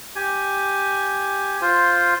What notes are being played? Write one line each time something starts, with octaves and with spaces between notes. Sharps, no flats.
G4 G#5
F4 C5